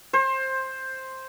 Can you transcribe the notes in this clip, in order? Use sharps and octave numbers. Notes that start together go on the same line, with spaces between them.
C5